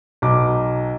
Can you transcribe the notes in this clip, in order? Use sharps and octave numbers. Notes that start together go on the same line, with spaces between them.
B1 D6